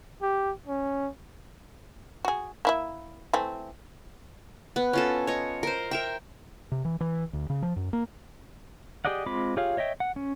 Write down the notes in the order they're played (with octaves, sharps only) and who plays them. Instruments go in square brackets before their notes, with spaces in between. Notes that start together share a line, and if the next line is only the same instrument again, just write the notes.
[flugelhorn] G4
C#4
[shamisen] F#4 G#4
A#3 E4 E5
E3 A3 C4
[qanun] B3
C#4 F4 A4
C#5 D#5
A#4 C5
A#4 E5 G5
[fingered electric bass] C3
E3
E3
D2
C#3
F3
F#2
A#3
[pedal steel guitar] G4 G#4 D5 D#5 F#5
G#3 C4 F4 B5 D6
F4 G4 G#4 C#5 F5
C#5 D#5 E5 G5
F#5
C#4